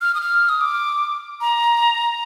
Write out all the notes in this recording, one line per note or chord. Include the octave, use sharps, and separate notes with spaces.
F6
D#6
F6
D#6
D6
A#5